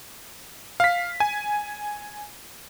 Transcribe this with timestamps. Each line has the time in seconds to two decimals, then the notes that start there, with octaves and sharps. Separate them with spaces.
0.80 F5 B6
1.20 G#5